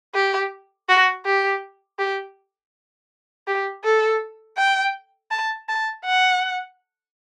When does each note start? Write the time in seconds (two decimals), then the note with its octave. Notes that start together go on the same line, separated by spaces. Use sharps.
0.14 G4
0.89 F#4
1.25 G4
1.99 G4
3.47 G4
3.84 A4
4.57 G5
5.31 A5
5.69 A5
6.05 F#5